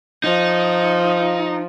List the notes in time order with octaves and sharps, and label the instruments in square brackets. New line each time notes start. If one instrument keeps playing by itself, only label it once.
[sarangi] F3 [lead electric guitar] D#4